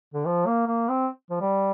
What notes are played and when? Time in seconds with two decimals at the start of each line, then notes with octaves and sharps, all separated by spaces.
0.14 D3
0.26 F3
0.47 A#3
0.67 A#3
0.89 C4
1.30 F3
1.41 G3